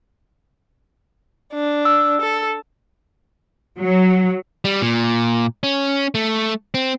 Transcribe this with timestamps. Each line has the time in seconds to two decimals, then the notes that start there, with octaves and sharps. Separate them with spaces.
1.54 D4
1.85 E6
2.21 A4
3.78 F#3
4.65 G3
4.82 A#2
5.63 C#4
6.15 A3
6.74 C4